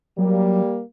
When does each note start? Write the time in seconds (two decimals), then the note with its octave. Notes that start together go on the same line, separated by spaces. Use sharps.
0.18 F#3 G3 A#3